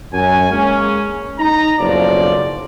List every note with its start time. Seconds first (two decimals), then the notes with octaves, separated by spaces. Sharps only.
0.14 F#2 G#5
0.52 G#3 A#3 C#4
1.39 D#4 A#5
1.80 F#1 B1 F3 D5